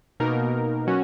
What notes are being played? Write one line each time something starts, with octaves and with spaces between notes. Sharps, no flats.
B2 A#3 D#4 A#4
F#3 C#4 F#4